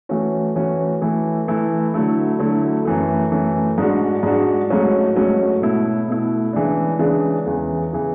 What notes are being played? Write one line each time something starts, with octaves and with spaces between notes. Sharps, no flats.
E3 A3 C#4 F#4
E3 A3 C#4 F#4
E3 A3 E4
E3 A3 E4
D3 F#3 A3 E4
D3 F#3 A3 E4
F#2 E3 A3
F#2 E3 A3
G#2 G#3 D4 F#4
G#2 G#3 D4 F#4
G#2 F#3 A3 C#4 F#4
G#2 F#3 A3 C#4 F#4
B2 A3 E4
B2 A3 E4
C#3 E3 G#3 D4
C#3 E3 G#3 D4
E2 C#3 E3
C#3 E3